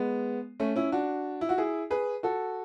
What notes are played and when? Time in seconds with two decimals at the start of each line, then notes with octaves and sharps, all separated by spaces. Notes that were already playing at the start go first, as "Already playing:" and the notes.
Already playing: G#3 B3
0.60 A3 C#4
0.76 C#4 E4
0.92 D4 F#4
1.41 E4
1.49 F#4
1.58 E4 G#4
1.90 G#4 B4
2.23 F#4 A4